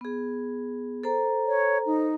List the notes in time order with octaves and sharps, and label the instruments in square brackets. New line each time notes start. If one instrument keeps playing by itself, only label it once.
[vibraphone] B3 G#4
A4 C5 A#5
[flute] C#5
D#4